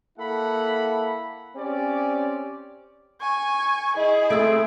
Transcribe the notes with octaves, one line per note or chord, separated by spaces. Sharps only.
A#3 E4 A4 F#5 B5
C4 C#4 G4 D5
G#5 C#6
E4 G#4 D#5
A3 C4 E6 D7